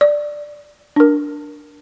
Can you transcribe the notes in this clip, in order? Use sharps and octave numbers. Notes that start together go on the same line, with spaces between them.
D5
D4 A#4